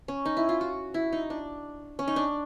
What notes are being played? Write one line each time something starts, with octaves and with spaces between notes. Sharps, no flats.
C#4
D#4
E4
F4
F#4
E4
D#4
D4
C#4
D#4
D4